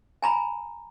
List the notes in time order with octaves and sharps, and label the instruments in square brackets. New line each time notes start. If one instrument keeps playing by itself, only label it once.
[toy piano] G#5 A#5 B5